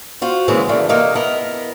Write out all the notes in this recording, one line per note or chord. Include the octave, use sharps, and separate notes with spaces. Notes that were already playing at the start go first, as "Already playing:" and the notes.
F4 F#4 C5
C#3 E3 G#3 A#3 C4
C#3 E3 A3 A#3 D4
C3 A3 A#3 D#4 D#5
B3 E4 A#4 D#5